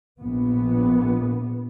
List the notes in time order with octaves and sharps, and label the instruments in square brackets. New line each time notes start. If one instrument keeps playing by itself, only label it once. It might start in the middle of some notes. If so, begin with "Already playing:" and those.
[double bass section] A#1 B3